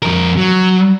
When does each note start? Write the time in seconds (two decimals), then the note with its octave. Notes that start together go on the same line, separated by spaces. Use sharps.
0.02 F2 A#4
0.37 F#3